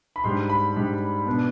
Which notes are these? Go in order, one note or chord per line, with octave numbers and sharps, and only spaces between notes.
B5
G#2 G3 D4 C6
B5
G#2 G3 D4
B2 B3 D4